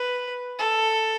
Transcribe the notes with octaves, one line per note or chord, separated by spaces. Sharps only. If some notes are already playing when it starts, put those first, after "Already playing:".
Already playing: B4
A4